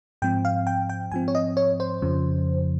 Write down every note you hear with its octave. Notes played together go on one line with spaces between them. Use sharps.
G#2 F3 C4 G5
F5
G5
G5
G#2 F3 C4 G#5
C#5
D#5
C#5
C5
F2 C#3 F3